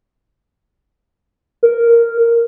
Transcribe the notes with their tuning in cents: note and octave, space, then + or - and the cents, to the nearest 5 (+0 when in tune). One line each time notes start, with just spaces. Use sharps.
A#4 -5